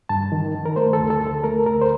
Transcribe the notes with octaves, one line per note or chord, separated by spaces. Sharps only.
G2 A5
D#3
D#3
A#4
A3 C5
A4
D2
A4
D2
A4
A3 A#4
D2 A#4
C5